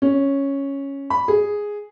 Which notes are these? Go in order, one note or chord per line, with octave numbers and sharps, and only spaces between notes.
C#4
B5
G#4